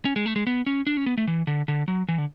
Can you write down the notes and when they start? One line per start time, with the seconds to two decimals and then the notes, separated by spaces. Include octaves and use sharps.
0.05 C#4
0.16 G#3
0.26 A3
0.36 G#3
0.47 B3
0.66 C#4
0.87 D4
0.97 C#4
1.06 B3
1.18 A3
1.27 E3
1.47 D3
1.68 D3
1.88 F#3
2.08 E3
2.18 D3